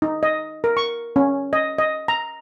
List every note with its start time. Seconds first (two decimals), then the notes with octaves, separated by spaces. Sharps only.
0.02 D#4
0.23 D#5
0.64 A#4
0.77 C#6
1.16 C#4
1.53 D#5
1.79 D#5
2.08 A#5